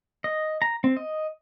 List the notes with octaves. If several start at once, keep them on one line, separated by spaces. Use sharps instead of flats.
D#5
A#5
C4
D#5